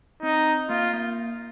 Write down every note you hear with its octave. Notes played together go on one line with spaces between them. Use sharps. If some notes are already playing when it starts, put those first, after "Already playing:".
C4 D#4
A#3 F4
A#3